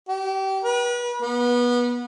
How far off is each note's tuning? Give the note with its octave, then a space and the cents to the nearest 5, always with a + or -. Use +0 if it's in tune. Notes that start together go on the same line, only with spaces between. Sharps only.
G4 -30
B4 -35
B3 -25